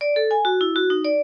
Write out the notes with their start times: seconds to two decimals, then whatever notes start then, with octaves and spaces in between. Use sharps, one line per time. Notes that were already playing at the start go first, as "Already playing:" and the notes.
0.01 D5
0.16 A4
0.31 G#5
0.45 F#4
0.61 E4
0.76 F#4
0.90 D#4
1.05 D5